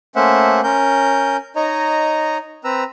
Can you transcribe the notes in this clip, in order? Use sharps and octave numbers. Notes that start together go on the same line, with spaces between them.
A3 A#3 C#4 C5 E5 F#5
C#4 A#4 G6
D#4 C#5 D#5 A#5
C4 B4 A#5 E6